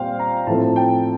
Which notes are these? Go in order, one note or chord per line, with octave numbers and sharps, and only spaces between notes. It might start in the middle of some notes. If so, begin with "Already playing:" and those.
Already playing: A#2 G3 C4 C5 F5 G5
A#5
A2 F3 A3 C4 A5
G5